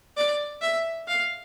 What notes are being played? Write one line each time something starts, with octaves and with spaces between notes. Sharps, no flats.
D5
E5
F5